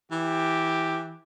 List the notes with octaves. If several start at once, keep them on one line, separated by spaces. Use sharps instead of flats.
E3 G4